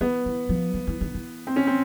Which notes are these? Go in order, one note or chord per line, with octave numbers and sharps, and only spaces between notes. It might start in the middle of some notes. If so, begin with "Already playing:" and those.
E3 B3
E3
F3
F3
E3
D#3
E3
C4
C#4
C4